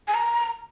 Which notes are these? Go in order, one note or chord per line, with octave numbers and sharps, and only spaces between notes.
G#5
A#5